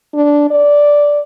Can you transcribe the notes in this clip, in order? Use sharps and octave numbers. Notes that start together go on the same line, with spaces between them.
D4
D5